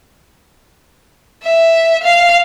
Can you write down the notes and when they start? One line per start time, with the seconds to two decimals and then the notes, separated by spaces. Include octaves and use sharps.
1.44 E5
2.03 F5